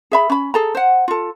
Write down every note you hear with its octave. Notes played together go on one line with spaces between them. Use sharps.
G#4 E5 B5
C#4 B5
G#4 A4 A#5
C5 F#5
F4 A4